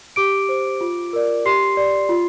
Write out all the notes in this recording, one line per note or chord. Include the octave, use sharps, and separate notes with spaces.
G4 D6 D7
C5
F4
A#4 D5
G4 C6 C7
D5
F4